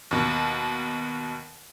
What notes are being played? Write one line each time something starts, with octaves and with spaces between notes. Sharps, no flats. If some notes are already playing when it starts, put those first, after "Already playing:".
D#2 B2